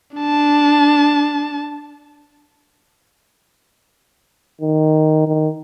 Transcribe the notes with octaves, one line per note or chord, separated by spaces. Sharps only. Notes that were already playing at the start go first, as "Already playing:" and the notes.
D4 A5
D#3
D#3